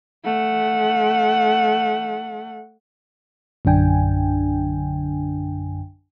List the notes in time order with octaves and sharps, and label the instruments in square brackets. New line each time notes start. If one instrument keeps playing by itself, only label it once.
[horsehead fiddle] A3 F#5
[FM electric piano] A#1 F#2 D3 D4 G5 G#5